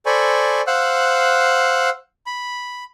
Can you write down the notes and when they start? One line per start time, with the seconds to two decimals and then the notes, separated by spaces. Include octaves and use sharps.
0.06 A4 C5 D5 G#5 B5 C#6
0.67 C5 F5 F#5 E6 F#6
2.26 B5